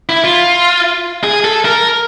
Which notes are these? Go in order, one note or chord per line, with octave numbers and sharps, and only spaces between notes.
E4
F4
G#4
A4
A#4